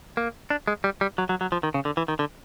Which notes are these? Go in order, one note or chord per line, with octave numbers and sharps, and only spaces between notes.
A#3
D4
G#3
G3
G3
F#3
F#3
F#3
F3
D#3
C#3
D3
E3
D#3
D3